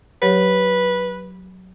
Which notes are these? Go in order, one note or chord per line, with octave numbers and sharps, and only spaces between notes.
F#3 G4 B4 C#5